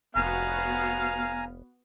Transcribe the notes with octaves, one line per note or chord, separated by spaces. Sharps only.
F1 B3 F#4 F5 G#5 A#5